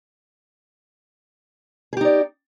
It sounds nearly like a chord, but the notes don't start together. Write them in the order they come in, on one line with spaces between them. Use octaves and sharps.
G#4 G4 D#4 D5